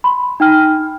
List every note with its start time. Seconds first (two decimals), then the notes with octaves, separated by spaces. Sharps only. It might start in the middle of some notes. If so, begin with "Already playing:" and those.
0.04 B5 C6
0.40 D#4 G5 F6